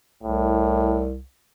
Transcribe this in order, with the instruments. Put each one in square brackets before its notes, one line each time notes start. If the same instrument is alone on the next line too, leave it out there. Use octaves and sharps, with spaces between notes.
[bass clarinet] C2 [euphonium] A2